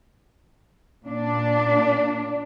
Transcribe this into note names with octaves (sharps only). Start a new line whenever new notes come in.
A#2 D4